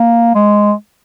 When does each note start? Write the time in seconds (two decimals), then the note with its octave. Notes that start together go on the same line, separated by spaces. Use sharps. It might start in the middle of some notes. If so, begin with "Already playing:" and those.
Already playing: A#3
0.35 G#3